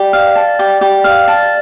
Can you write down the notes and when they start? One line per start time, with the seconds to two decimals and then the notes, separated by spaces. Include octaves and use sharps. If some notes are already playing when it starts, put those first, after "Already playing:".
Already playing: G4 D5
0.13 F5
0.36 A5
0.59 G4
0.81 G4
1.04 F5
1.28 A5